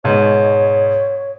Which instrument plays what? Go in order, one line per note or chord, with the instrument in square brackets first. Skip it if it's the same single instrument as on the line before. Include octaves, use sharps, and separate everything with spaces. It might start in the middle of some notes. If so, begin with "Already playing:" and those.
[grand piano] G#2 B2 [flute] C#5